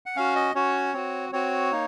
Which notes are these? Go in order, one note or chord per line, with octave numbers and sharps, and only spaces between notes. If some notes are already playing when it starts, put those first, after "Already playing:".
F#5
C#4 F#4 F5
D#5
C#4 F#4 C#5
C4 F#4
C4 F#4 C#5
A#3 D#4